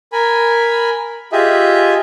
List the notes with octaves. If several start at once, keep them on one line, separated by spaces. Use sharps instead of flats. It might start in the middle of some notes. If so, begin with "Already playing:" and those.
A#4 G#5 B5
F4 G4 G#4 D#5 E5